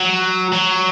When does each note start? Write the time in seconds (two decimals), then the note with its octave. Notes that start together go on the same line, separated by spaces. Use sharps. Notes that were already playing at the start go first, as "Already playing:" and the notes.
Already playing: F#3
0.52 F#3